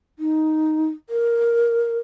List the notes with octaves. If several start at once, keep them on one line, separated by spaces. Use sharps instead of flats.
D#4
A#4